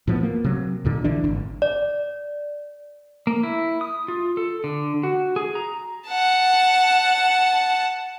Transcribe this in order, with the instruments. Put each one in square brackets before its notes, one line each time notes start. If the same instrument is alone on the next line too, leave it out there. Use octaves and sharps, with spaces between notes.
[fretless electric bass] A2 F3 G3 B3
A#3
C3 F#3
D#2 A#2 D3
A#1 D3 E3 D4
G#1 G#2
[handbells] D5
[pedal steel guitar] A#3
E4
D#6
F4
A4
D3
F#4
G#4
A#5
[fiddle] F#5 A5